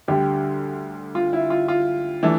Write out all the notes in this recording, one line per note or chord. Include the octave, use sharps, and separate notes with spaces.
D2 D3 G3 G4
F4
E4
F4
F4
E3 A3 D4